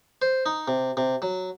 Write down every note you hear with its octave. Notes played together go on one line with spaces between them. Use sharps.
C5
D#4
C3
C3
F#3